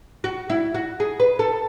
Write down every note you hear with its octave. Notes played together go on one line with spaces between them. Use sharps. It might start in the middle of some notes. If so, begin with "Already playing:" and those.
F#4
E4
F#4
G#4
B4
A4